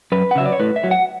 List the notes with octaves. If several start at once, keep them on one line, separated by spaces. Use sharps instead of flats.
F#2 B4
F#5
C#3 F#3 E5
D5
C#5
A2 B4
E5
F#3
F#5